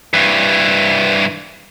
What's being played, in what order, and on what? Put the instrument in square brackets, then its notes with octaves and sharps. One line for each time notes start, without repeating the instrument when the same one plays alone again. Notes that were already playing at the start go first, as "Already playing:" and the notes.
[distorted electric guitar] G2 E3